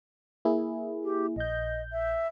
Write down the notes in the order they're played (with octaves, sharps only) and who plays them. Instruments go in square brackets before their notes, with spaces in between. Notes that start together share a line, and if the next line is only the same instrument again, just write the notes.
[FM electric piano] A#3 E4 G#4
[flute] G4
[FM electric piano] A#1 G6 [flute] D#5
[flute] E5